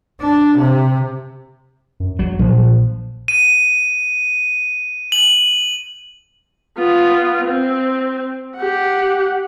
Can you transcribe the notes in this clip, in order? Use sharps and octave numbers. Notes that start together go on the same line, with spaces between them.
D4
C3
F#2
A#1 F#3
A#1 F3
D#7
F#7
B3 F4
C4
G4 F#5